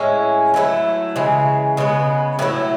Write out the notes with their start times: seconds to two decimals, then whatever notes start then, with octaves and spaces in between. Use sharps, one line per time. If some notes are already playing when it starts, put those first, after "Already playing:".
Already playing: A2 G#3 C#4 E4
0.54 F#3 A3 E4
1.16 C#3 E3 G#3
1.77 C#3 G#3 B3
2.39 A2 F#3 A3 E4